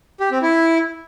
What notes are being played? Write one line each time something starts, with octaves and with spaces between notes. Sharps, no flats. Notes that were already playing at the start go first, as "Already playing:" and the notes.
G4
C4
E4